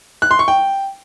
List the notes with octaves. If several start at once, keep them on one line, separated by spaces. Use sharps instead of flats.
F#6
C6
C#6
G5